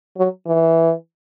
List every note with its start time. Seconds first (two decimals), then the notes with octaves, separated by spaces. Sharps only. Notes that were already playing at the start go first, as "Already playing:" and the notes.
0.17 F#3
0.47 E3